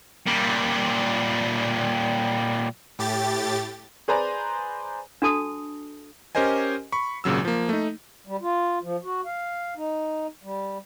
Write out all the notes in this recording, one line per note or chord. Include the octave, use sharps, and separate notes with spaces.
A#2 G3
A2 G4 A6
G#4 B4 C5 D5 G#5 A#5
D4 F#4 A4 A5 D#6
C#4 G4 A#4 C5 D#5 G#5
B5 C#6
G#1 A#2 C#3 F#3 E6
F3 A#3
A3 D#4
G3
F4
F3
F#4
F5
D#4
G3